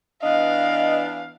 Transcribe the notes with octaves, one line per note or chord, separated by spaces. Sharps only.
E3 B3 D4 D#5 F5